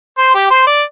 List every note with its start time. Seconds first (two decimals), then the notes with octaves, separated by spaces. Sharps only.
0.18 C5
0.34 G4
0.50 C5
0.67 D5